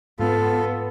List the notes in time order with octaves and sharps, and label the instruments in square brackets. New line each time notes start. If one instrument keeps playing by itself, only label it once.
[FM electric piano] G#2 [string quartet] B3 [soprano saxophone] F4 [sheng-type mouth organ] A4